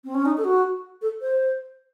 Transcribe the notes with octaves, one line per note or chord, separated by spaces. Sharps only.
C4
C#4
D#4
A4
F#4
A4
C5